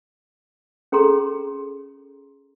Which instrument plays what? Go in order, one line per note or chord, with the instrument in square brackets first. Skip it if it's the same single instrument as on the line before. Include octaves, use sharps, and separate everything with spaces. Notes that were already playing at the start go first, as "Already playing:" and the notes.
[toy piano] C#4 G#4 A4 A#5 C6